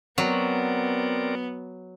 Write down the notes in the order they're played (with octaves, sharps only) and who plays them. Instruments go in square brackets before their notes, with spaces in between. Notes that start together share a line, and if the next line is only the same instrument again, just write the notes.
[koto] F#3 [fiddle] B3 [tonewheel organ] C4 A#4 D5